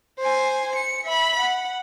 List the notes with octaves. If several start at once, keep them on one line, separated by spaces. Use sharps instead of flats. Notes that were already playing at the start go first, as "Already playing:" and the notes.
C5 G#5
C#7
E5 B5
F#5